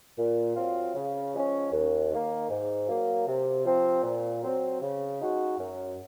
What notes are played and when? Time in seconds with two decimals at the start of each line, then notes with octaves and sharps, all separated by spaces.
0.17 A#2
0.56 F#3 C4 F4
0.95 C#3
1.33 F3 G#3 C#4
1.72 D#2
2.11 D#3 A#3
2.49 G#2
2.88 F#3 A#3
3.27 C3
3.65 F3 C4
4.03 A#2
4.43 F#3 C4
4.81 C#3
5.20 G#3 D#4 F#4
5.58 F#2